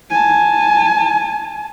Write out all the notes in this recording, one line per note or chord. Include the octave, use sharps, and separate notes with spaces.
G#5 A5